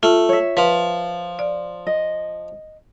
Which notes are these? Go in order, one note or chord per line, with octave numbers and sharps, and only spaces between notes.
A3 F4
C#5 E5
F3 B4
D5
D#5